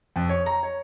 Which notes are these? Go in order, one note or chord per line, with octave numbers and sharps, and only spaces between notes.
F2
C#5
A#5
C#5